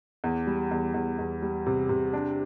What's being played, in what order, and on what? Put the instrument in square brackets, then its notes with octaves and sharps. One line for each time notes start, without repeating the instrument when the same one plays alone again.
[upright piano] E2
G3
E2
E2
E2
G3
C3
C3
D4